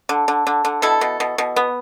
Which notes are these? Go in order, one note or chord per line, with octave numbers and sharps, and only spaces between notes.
D3
D3
D3
D3
B2 E4 A4
B2
B2
B2
B3